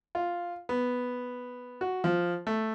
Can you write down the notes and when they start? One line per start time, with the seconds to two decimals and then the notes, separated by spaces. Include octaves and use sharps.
0.15 F4
0.69 B3
1.81 F#4
2.04 F3
2.47 A3